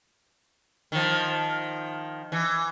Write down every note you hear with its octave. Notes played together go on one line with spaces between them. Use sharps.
D#3 F3
E3